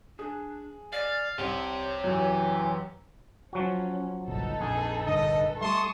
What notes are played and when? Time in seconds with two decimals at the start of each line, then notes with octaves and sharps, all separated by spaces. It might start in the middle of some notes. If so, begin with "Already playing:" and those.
0.19 D4 G#4
0.93 D5 F5
1.38 C2 G4 C5 C#5
2.04 F#2 E3
3.53 F3 F#3 C#4 F#4
4.28 G1 C2 A#2 D#4 A4 B4
4.61 A#1 F2 G#4
5.06 F1 G2 D3 D#5
5.61 G3 A3 G#4 A5 C6 C#6 D#6